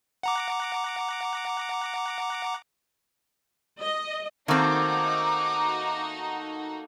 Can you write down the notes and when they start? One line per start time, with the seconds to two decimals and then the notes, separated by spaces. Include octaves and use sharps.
0.23 F#5 A#5 D6
3.82 D#5
4.48 D#3 A3 A#3 C4 D#4 F#4 D6